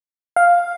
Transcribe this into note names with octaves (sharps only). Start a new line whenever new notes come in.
F5